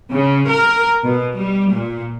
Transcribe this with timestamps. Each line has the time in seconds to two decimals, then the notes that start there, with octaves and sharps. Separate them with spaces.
0.11 C#3
0.47 A#4
1.04 B2
1.36 G3
1.71 A#2